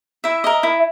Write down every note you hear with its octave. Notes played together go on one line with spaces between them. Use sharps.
E4 E5
A#4 D#5
E4